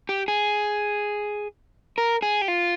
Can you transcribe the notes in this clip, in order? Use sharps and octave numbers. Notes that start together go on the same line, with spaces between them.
G4
G#4
A#4
G#4
G4
F4